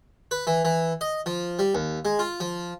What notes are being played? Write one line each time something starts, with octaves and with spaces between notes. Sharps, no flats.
B4
E3
E3
D#5
F3
G3
D#2
G#3
F4
F3